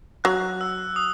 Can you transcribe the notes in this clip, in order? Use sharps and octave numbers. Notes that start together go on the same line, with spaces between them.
F#3 F#6
E6
D#6